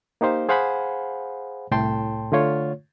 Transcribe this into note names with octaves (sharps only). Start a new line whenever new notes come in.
A#3 D#4 G4 C5 F5
G#4 C5 F5 F#5 G#5 B5
C2 A2 G5 A5 C6
D3 A3 F4 C#5